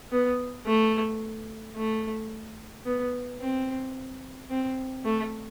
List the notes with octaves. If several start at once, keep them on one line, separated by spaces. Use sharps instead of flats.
B3
A3
A3
B3
C4
C4
A3